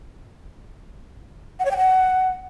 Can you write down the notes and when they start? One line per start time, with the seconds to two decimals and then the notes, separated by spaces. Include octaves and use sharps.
1.60 F#5
1.65 C#5
1.71 G5
1.77 F#5